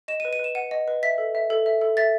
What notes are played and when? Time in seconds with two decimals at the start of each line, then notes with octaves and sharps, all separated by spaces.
0.08 D#5 E7
0.20 D#7
0.25 B4
0.33 D#7
0.39 B4 E7
0.55 F#5 D#7
0.71 D#5
0.88 B4
1.03 E5 B6
1.18 A4
1.35 E5
1.50 A4
1.66 E5
1.81 A4
1.97 E5 A6